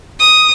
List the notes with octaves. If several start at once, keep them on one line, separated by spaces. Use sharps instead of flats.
D#6